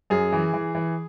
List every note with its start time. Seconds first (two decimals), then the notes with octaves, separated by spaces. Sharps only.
0.10 F#2 G#4
0.32 E3
0.53 E3
0.75 E3